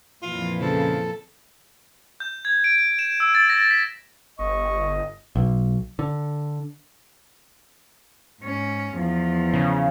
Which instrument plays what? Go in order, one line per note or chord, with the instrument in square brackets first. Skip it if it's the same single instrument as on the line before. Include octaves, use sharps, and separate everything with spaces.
[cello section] F2 A#2 E3 [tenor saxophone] F4
[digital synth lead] C#3 [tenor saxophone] F3 [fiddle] A4
[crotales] G6
G#6
D7
E7
E6
A6
A#6
B6
[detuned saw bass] G1 [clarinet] D#5 [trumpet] C#6
[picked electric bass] B1
D3
[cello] G#2 C#4
E2 F3
[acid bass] C#3